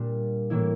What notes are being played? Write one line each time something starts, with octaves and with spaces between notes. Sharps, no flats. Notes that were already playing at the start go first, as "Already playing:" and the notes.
Already playing: A#2 G3 D4
A2 E3 A#3 E4